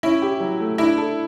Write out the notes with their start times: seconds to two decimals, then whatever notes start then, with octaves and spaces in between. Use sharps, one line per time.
0.03 C#4 E4
0.22 G4
0.40 F#3
0.60 A3
0.78 D4 E4
0.98 A4